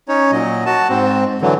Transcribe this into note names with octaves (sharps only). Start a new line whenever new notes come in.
C#4 D#4 C#5
A#2 F#3 D#5
F#4 A5
G#2 C4
D3 E3 F#3